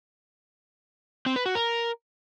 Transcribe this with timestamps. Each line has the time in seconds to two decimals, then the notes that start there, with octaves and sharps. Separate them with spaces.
1.26 C4
1.36 B4
1.46 F#4
1.55 A#4